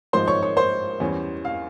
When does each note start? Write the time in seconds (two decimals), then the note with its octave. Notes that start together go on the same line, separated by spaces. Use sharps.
0.13 G#1 G#2 F3 G#3 C5 C6
0.28 C#5 C#6
0.42 C#5 C#6
0.57 C5 C6
1.00 E2 E3 G3 C#4
1.45 F5